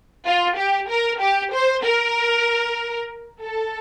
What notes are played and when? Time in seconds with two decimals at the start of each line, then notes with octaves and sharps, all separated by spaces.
0.25 F4
0.57 G4
0.89 A#4
1.20 G4
1.53 C5
1.84 A#4
3.42 A4